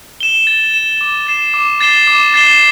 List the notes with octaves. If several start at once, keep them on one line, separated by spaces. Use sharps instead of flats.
E7 G7
A6
E7 G7
D6
A6 C7 E7 G7
D6
A6 C7 E7 G7
D6
A6 C7 E7 G7